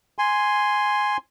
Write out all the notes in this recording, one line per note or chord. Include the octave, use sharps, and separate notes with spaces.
G#5 C6